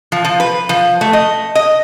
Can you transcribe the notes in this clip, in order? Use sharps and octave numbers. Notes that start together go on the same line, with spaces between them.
F3
F3
B4
F3
A3
D#5
D#5